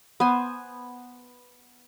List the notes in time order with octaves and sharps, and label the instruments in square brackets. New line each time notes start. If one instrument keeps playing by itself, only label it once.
[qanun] B3 C5 G#5